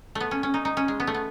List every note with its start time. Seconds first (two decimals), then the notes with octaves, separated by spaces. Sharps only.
0.15 A3
0.20 B3
0.31 C#4
0.43 C#4
0.54 D#4
0.65 D#4
0.77 C#4
0.88 G#3
1.00 B3
1.07 A3
1.14 B3